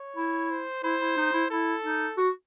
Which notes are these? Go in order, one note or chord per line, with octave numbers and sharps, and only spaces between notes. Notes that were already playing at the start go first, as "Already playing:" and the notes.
Already playing: C#5
E4
C5
E4 C5
E4
D#4
E4
E4 A4
D#4
F#4